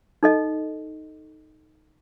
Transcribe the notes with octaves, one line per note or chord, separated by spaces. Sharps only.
D#4 A4 D#5